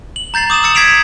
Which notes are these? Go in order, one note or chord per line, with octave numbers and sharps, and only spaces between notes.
F#7
A#5 G6 A6 C7 F#7
D6 D#6 A6 E7
D6 E6 A6 C#7
G#6 B6 C7 D7 F7